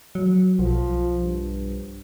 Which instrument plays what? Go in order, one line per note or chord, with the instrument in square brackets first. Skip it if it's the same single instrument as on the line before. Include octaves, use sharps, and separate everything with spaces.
[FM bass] F#3
[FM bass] B1 [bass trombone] F3
[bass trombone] G2